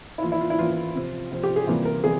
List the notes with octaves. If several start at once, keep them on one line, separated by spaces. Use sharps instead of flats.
E4
E3 A#3 F4
E4
F4
E4
E3 A#3 F4
C3 F3 C4
C3 F3 C4
G4
G#4
C3 E3 G3 A#3 F4
A#4
C3 E3 G#4